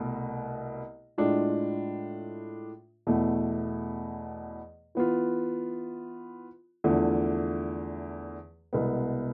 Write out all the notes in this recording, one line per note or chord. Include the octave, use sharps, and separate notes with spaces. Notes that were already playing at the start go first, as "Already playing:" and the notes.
Already playing: C2 B2 A3
A2 G#3 D4 F4
E2 B2 A3
E3 B3 F4
E2 D3 F3 A3
C2 B2 G#3 B3